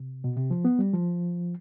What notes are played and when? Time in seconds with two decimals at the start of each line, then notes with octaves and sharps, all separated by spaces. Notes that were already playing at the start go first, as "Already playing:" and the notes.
Already playing: C3
0.24 B2
0.36 C3
0.50 F3
0.65 B3
0.79 G3
0.93 F3